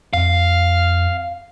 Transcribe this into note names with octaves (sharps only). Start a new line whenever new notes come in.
F2 F5